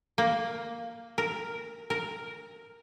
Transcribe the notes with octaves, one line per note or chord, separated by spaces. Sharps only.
A#3
A#4
A#4